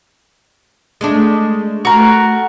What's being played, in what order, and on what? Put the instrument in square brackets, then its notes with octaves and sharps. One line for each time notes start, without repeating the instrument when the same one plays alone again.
[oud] G#3 A3 D4
[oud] A3 [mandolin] F#4 A#4